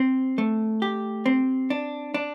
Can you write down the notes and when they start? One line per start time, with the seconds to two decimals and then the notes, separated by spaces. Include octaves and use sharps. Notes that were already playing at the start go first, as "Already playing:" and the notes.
Already playing: C4
0.38 A3
0.82 G4
1.26 C4
1.70 D4
2.14 D4